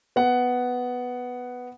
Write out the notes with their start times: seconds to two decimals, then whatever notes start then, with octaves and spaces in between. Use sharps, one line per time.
0.16 B3 F#5